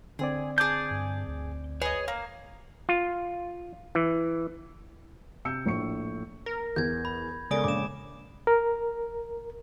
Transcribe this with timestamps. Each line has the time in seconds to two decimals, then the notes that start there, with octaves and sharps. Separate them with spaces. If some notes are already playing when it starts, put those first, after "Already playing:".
0.19 D3 C4 G#4 D5
0.58 G#4 A5 D6 G6
0.91 G2
1.27 D2
1.82 G#4 B4 C#5 D#5
2.08 A#3 F5
2.89 F4
3.95 E3
5.45 C3 E6 G6 C#7
5.66 A#1 A2 C#6 C#7
6.46 A#4 A#6
6.76 E2 G6 G#6
7.05 B5
7.51 C#3 G#3 B3 A4 A#4 D5
7.64 A#1 D6 E7
8.47 A#4